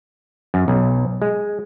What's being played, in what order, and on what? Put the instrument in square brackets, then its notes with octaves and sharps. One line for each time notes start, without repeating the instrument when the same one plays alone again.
[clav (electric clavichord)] F#2
B1
G#3